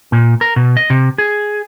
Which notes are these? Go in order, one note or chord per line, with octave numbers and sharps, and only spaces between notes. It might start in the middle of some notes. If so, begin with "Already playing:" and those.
A#2
A#4
B2
D#5
C3
G#4